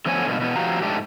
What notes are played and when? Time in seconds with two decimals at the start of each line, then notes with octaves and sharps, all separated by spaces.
0.06 D3 F3 A3 B3 C#5 G#5
0.27 G2 B2 A#3
0.40 B2 E3 B3
0.56 A2 F3 F#4 G4 F5 A#5
0.82 G#2 A3 D4 G4